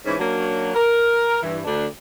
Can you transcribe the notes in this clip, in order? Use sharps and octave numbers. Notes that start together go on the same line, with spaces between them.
G#2 E3 C#4
F#3 A#3 C#4 D4 F#4
A#4
G2 E3
D2 D4